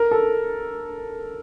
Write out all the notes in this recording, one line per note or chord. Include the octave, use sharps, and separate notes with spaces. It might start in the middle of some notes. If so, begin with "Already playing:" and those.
Already playing: A#4
A4